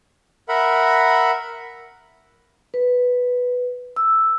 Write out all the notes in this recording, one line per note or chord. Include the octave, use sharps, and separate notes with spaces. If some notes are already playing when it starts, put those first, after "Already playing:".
A#4 E5 F#5 B5
B4
E6